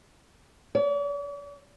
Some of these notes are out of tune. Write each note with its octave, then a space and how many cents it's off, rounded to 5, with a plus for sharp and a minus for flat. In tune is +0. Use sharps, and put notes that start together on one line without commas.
D5 -45